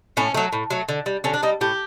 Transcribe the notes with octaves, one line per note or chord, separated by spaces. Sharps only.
A2 C#4
F#3 A3
A2
F#3 A3
D3
G3
D3 C#4
D4
G3 D#4
A2 G4